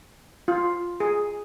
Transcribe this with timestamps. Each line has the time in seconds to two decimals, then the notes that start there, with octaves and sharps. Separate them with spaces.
0.48 F4
1.00 G#4